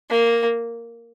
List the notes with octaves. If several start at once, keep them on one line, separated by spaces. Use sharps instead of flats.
A#3